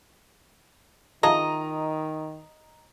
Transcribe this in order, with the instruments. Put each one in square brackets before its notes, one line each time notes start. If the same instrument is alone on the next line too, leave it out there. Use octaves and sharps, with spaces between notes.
[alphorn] D#3 [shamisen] F4 G#4 A5 [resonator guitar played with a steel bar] D#5 [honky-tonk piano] A#5